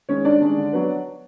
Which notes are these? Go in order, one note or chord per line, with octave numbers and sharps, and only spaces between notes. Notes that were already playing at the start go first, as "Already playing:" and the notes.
D#3 G#3 C#4 C#5
G2 D4 D5
D#3 G#3 C#4
D3
F#3 B3